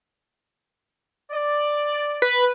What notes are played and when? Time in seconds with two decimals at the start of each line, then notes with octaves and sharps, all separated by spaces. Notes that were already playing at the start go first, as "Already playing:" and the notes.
1.32 D5
2.22 B4